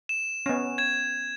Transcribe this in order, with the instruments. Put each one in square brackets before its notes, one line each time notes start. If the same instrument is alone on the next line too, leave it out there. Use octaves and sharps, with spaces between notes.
[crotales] E7
[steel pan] B3 C#4
[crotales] G#6 E7